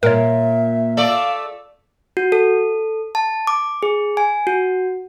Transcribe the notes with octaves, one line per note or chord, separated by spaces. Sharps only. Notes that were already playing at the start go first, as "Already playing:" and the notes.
A#2 A#4 C#5 E5
A3 A4 D5 F5
F#4
A4
A5
D6
G#4
G#5
F#4